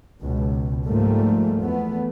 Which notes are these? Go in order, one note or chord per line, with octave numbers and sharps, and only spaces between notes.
C#2 B2
G#2 F3 G3 A3 A#3
E2 A3 B3